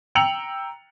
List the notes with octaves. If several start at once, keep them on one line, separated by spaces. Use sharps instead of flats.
G5 A#5 E6 C#7 F7 F#7